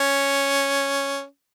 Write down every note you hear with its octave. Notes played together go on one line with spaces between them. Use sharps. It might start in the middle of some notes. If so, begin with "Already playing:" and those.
Already playing: C#4